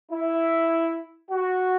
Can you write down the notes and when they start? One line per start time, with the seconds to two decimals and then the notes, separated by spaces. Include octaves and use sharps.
0.12 E4
1.30 F#4